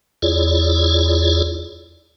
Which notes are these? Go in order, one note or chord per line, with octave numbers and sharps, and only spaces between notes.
E2 E4 F4 G#4 C#5 D5